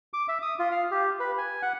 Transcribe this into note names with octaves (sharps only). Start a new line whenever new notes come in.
D6
E5
D#6
F4
F5
G4
B4
G#5
F#5